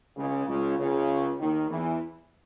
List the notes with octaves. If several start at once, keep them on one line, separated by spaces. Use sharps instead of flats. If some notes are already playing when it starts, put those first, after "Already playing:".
C#2 C#3
C#2 C#3
C#2 C#3
D#2 D#3
E2 E3